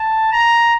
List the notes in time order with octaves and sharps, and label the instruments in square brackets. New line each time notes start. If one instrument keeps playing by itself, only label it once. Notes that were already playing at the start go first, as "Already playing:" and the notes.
Already playing: [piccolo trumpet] A5
A#5